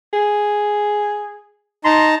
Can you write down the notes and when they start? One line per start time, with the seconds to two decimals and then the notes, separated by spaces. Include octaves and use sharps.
0.13 G#4
1.85 D#4 A5 A#5 C6